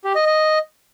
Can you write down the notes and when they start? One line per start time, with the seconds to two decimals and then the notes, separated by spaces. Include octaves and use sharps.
0.05 G4
0.15 D#5
0.26 D#5